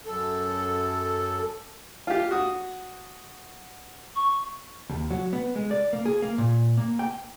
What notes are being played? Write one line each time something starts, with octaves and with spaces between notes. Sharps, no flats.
F#2 A4
F4 G4
F#4 D#6
C#6
D#2
F#3
B3
G#3
D5
A#3
G#4
A#3
A#2
A#3
G5